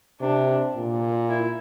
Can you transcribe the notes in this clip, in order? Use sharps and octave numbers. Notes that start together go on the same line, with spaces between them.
C3 D4
A#2
E4